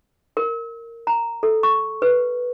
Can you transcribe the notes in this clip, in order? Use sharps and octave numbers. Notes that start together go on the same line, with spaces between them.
A#4
A#5
A4
C#6
B4